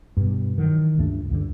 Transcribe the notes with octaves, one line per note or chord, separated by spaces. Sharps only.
G2 B2
D#3 E3 F#3
C#2 G2 A3 D4
C#2 G2 D3